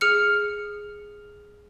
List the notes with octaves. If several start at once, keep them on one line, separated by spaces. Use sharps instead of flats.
G#4 F6 C#7